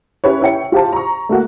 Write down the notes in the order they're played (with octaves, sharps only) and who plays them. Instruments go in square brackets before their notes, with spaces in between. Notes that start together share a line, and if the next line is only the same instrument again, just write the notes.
[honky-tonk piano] C#4 E4 G4 B4 C#5
E4 C#5 G5 C#7
F4 G4 C5 A5
A#5 C#6
A3 A#3 F#4